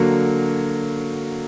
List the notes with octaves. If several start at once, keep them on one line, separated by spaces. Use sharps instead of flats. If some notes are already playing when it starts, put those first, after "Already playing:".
Already playing: D3 F#3 A#3